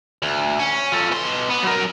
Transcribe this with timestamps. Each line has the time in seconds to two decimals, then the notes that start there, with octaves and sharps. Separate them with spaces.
0.22 D2
0.59 C#4
0.92 F4 A4
1.12 B2 C6
1.50 B3
1.63 F#3 A#4